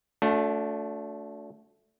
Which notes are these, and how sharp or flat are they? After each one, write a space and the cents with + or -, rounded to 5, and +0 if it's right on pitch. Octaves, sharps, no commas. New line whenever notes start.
A3 +0 D4 -35 F#4 -30